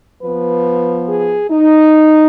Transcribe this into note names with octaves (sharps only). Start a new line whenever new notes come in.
F3 B3 B4
G#4
D#4